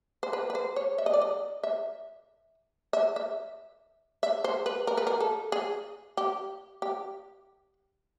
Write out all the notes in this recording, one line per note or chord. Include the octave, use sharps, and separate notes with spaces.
C5
B4
B4
C5
C#5
E5
D#5
D5
D#5
E5
E5
E5
E5
C5
B4
A#4
B4
A#4
A4
G#4
G4
G4